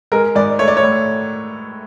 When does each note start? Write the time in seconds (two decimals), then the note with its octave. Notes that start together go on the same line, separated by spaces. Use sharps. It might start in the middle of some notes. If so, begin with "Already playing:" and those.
0.12 G#3 A#4
0.35 G#2 D5
0.59 A3 C#5
0.68 D5
0.77 C#5
0.83 A2